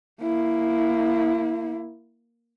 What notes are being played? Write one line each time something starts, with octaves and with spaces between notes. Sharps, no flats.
A#3 E4